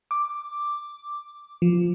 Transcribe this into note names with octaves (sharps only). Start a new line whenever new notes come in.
D6
F3